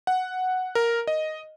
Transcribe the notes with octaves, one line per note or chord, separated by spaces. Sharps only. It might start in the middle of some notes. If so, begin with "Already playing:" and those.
F#5
A#4
D#5